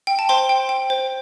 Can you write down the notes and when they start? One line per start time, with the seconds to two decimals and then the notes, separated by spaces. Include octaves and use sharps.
0.07 G5
0.19 A5
0.29 C5 G5 C6
0.49 G5
0.69 G5
0.90 C5